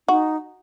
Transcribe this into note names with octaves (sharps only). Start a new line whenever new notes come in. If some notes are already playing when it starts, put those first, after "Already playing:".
D#4 F#4